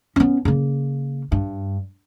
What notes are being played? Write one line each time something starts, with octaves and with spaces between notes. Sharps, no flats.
B3 C#4
C#3 A#3
G2